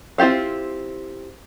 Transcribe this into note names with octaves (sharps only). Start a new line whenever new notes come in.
C4 E4 F4 G4 F5